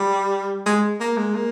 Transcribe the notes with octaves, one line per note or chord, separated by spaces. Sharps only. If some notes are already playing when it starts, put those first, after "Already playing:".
Already playing: G3
G#3
A#3
G#3
A#3